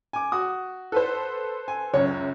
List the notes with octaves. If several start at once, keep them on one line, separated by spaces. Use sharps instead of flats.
G#5 D6
F#4 D#6
A4 B4 C5
G#5
C#2 F#2 C#4 C#5